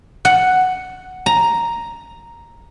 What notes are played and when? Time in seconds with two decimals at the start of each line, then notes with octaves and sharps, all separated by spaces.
0.25 F#5
1.26 A#5